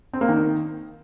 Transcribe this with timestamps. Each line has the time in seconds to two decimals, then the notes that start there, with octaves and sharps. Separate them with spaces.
0.13 C4
0.21 A#3
0.29 D#3